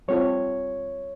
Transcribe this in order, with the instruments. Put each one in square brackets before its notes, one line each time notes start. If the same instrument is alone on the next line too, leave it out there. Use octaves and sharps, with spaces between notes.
[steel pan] G3 C4 F4 A4 [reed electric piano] C#5